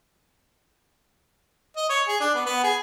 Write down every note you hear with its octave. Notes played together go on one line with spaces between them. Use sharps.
D#5
C#5
G#4
D4
B3
B3
G#4